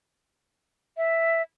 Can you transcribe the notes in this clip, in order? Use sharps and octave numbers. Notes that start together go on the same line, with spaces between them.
E5